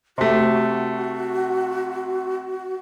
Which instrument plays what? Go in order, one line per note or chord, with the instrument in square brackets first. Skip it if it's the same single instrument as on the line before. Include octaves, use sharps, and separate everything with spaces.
[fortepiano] C3 A3 [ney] F#4